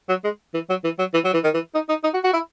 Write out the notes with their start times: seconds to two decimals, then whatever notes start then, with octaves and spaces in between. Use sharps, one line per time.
0.09 F#3
0.24 G#3
0.54 E3
0.69 F#3
0.84 E3
0.99 F#3
1.14 E3
1.25 F#3
1.34 E3
1.44 D#3
1.54 E3
1.74 D#4
1.89 D#4
2.04 D#4
2.14 F#4
2.24 F#4
2.33 E4